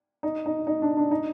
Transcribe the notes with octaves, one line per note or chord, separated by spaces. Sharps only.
D#4
D#4
D#4
D4
D4
D#4